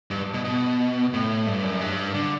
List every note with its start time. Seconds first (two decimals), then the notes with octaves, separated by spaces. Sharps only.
0.11 G2
0.34 B2
0.44 B2
1.13 A2
1.47 G2
1.63 F#2
1.81 G2
2.14 D3